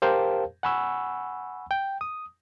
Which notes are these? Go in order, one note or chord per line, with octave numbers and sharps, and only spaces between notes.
G4 A#4 C5 F5 G5 A5
F#5 G#5 B5 C#6 E6
G5
D#6